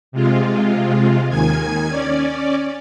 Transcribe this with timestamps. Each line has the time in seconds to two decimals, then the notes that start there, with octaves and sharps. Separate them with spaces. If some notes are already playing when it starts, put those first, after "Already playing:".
0.12 C3 G#3 F4
1.29 D#2 D#3 G#5 G#6
1.89 C#4 D5